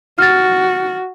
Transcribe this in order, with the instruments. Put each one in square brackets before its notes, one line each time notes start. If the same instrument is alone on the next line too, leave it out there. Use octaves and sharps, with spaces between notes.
[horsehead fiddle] F#4 [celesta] F6 A6